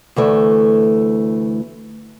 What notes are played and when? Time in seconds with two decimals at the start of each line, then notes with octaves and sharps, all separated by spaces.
0.16 D2 E3 A3